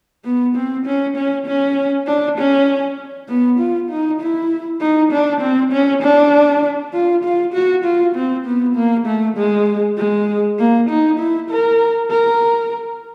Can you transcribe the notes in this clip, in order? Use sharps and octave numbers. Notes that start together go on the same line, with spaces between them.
B3
C4
C#4
C#4
C#4
D4
C#4
B3
F4
D#4
E4
D#4
D4
C4
C#4
D4
F4
F4
F#4
F4
C4
B3
A#3
A3
G#3
G#3
A#3
D#4
E4
A#4
A#4